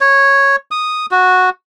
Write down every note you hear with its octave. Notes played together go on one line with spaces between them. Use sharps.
C#5
D#6
F#4